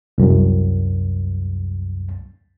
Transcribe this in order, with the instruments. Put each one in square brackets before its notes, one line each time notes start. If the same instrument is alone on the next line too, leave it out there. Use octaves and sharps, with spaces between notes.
[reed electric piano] C2 F#2